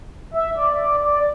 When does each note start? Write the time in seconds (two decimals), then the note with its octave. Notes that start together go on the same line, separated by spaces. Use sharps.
0.34 E5
0.56 D5
0.80 D5
1.03 D5